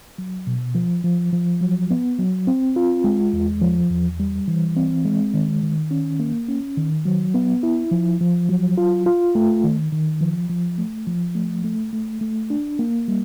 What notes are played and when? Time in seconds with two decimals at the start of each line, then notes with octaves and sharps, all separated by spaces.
0.18 F#3
0.47 B2
0.75 F3
1.04 F3
1.33 F3
1.61 F#3
1.91 B3
2.19 F#3
2.47 C4
2.76 F4
3.04 G#3
3.33 E2
3.61 F3
3.91 E2
4.20 G3
4.48 E3
4.76 C4
5.05 G#3
5.34 D#3
5.63 D#3
5.91 C#4
6.20 A#3
6.49 C#4
6.77 D#3
7.05 F#3
7.34 B3
7.63 E4
7.91 F3
8.21 F3
8.49 F#3
8.78 F4
9.06 F4
9.35 A3
9.64 D#3
9.92 D#3
10.21 F3
10.50 F3
10.78 A3
11.07 F3
11.35 A3
11.64 A3
11.93 A3
12.21 A3
12.50 D4
12.79 A#3
13.08 G3